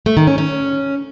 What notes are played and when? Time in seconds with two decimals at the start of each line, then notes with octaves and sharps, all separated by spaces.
0.06 A3
0.17 D#3
0.27 C#4
0.38 C#4